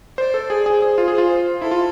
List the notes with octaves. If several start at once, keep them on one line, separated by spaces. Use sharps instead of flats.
C5 D5
A4
G#4
G#4 C5
G#4
F4
G#4
F4
E4 A4
F4